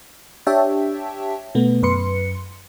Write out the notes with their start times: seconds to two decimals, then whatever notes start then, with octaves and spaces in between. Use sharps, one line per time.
0.47 D4 G4 C#5 E5 G5 A5
1.55 B2 A3 B3
1.83 F#2 B4 C6 C#7